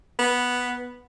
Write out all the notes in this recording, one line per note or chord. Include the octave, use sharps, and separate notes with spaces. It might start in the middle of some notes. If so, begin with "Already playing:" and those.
B3